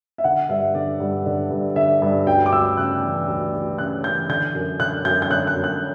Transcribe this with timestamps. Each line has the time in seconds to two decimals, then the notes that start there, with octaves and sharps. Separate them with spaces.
0.18 E5
0.24 D3 F#5
0.49 G2 E5
0.75 D3 D5
1.00 G2
1.26 D3
1.51 G2
1.76 D3 E5
2.02 G2
2.27 D2 G5
2.46 D6
2.52 D2 E6
2.77 C#3 F#6
3.02 E3
3.28 D2
3.53 D2
3.78 C#3 F#6
4.04 E3 G6
4.29 D3 G6
4.55 F#2
4.80 D3 F#6
5.05 F#2 G6
5.22 G6
5.30 D3 F#6
5.47 F#6
5.56 F#2
5.64 F#6